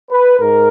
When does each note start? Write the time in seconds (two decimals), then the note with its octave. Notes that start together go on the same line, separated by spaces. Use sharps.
0.11 B4
0.39 G#2 A#4